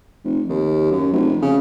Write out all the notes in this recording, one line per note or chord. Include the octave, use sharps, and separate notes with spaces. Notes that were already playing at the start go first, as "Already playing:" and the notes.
F1
D#2
F#2
F1
C#3